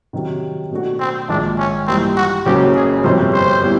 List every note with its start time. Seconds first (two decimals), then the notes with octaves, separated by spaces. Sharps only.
0.13 C3 D#3 F#3
0.71 B2 F#3 A3 D4 F#4
1.00 C4
1.29 A#1 G#2 D#3 G#3 D4
1.59 C#4
1.87 G2 E3 G3 A#3 C4
2.17 F#4
2.45 F#1 F#2 C#3 F#3 G4
2.75 G#4
3.04 G1 F2 C3 C5
3.33 C5
3.62 A#2 G3 B3 E4